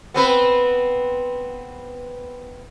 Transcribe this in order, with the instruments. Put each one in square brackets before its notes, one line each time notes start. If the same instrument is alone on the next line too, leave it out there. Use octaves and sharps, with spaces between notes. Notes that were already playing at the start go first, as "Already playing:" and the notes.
[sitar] B3 C4 B4